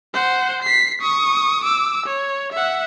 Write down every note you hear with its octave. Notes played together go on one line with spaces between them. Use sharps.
C5 F#5
B6 C7
C#6 D#6
D6 E6
C#5
E5 F#5